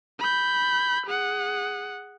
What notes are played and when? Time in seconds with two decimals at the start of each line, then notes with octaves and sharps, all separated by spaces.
0.20 B5 G6
1.06 G#4 F#5